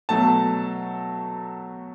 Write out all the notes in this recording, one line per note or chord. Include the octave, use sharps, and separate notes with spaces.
B2 F#3 A3 A5